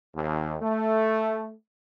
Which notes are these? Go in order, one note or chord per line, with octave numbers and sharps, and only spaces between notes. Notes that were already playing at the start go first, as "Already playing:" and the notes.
D#2
A3